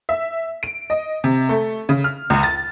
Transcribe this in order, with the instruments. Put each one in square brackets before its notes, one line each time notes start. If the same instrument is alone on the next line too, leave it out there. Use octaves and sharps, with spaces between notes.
[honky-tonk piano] E5
D7
D#5
C3
A3
C#3
F6
C#2
A6